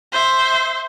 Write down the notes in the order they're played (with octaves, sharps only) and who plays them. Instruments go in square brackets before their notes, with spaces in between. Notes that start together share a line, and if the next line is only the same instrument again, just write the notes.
[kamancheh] C5 E5